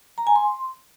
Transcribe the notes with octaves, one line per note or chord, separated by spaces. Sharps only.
A#5
G#5
C6